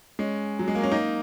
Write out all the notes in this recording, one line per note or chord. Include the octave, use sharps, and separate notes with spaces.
G#3 C#4
F#3
G#3
A#3
C#4
A#3 D#4